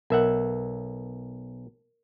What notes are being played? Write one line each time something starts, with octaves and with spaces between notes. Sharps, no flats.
B1 A#4 E5 F#5